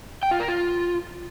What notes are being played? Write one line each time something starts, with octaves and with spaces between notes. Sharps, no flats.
G5
F4
A#4
F4